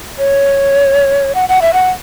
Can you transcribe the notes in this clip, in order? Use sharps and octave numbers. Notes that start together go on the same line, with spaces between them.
C#5
F#5
F#5
E5
F#5